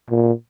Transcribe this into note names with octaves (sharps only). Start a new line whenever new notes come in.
A#2